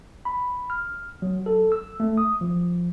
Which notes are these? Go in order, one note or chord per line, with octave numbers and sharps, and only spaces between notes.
B5
F6
F#3
A4
E6
A3
D#6
F3